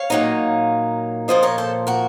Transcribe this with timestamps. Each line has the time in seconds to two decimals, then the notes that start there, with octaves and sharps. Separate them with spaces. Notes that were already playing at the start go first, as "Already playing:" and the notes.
Already playing: C#5 F5
0.10 A#2 F#3 A#3 D#4
1.28 A#2 F3 A#3 F4 C5 D#5
1.43 A#4 C#5
1.58 A4 C5
1.87 F#4 A#4